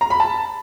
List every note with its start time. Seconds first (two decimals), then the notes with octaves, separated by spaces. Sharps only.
0.01 A#5
0.10 B5
0.20 A5